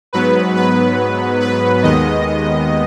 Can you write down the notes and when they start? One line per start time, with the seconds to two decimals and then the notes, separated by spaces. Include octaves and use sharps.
0.13 G#2 F#3 B3 B4
0.56 B4
1.40 B4
1.83 D#2 D#3 G#3 B3 D#5